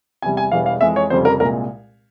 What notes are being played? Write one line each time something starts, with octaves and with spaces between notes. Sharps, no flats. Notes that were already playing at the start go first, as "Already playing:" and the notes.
E2 C3 G3 G#5
G#5
E1 E2 E3 G3 F5
F5
F2 E3 G#3 E5
C#5
F1 F2 C#3 G3 C5
A#4
C2 A#2 G#3 A#4